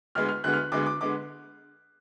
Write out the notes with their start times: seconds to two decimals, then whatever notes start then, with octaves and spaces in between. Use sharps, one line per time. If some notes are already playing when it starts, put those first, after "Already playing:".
0.15 D2 D3 G#3 B3 F6
0.29 F6
0.44 D2 D3 G#3 B3 F#6
0.53 F6
0.72 D2 D3 G#3 B3 D6
0.86 D6
1.01 D3 G#3 B3 D6